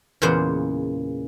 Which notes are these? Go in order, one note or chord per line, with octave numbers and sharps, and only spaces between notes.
E2 A#2 C#3 G#3 C5 F#5